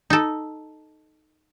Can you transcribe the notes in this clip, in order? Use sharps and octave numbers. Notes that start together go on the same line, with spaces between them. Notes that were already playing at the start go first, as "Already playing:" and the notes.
D#4 A4